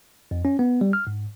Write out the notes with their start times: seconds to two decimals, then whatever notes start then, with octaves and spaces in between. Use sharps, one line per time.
0.31 F2
0.45 C#4
0.59 B3
0.81 G3
0.93 F6
1.07 G#2